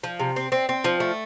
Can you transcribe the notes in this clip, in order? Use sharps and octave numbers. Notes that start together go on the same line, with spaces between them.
F3
C3
C4
C4
C4
F3
A3